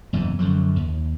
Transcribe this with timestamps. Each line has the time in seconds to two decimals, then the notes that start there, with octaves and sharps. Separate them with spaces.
0.13 F#1 E2 G#2 E3
0.39 F#2 D3 F3 F#3
0.76 D#2